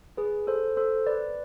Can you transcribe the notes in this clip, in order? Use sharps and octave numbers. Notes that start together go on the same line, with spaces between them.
G#4 B4
A4 C5
A4 C5
B4 D5